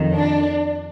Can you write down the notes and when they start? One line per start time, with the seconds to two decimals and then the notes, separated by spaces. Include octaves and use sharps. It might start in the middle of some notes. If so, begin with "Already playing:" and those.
Already playing: F2 D#3
0.15 D4